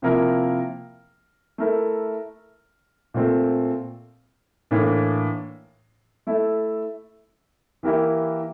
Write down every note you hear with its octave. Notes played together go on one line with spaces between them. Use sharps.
C3 F3 A#3 E4 A#4
A3 E4 A#4
A#2 A3 C4
A2 E3 A#3 D4
A3 E4 A4
E3 A#3 E4 G4 A#4